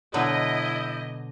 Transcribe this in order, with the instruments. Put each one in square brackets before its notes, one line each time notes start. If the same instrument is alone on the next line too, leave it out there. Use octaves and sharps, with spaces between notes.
[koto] B2 D3 F#3 [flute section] E4 G6 [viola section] D#5